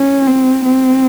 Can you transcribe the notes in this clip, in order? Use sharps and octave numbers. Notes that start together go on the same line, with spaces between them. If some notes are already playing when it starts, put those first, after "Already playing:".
Already playing: C#4
C4
C4